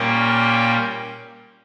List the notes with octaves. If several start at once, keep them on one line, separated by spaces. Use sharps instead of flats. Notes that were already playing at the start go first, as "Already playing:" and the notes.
Already playing: A#2 G3 A#3 C#4 G5